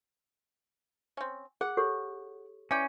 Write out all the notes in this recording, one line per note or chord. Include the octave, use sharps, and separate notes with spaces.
C4 C#4
G#4 F#5
G4 A4 C#5
E3 C#4 D5 G5